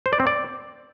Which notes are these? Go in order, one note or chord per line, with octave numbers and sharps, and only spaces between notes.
C5
D5
C4
D5